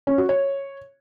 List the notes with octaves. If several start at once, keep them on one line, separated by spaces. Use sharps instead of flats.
C#4
F#4
C#5